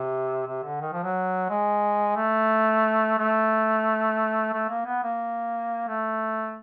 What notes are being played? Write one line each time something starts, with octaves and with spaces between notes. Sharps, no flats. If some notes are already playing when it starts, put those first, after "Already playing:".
Already playing: C3
C3
D3
D#3
F3
F#3
G#3
A3
A3
A3
A#3
B3
A#3
A3